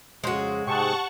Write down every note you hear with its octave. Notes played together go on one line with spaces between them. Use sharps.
F2 C#3 G#3 F#4 C5
G#2 C3 G#4 F#5 G5 A5 C#6